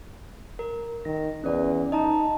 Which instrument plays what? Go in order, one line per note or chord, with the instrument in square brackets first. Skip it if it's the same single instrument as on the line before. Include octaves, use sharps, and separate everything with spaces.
[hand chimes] A#4
[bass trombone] D#3 [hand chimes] A#6
[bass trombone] E2 [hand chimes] C#4 B4 D5
[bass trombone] D#4 [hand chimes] D#5 A5 A#5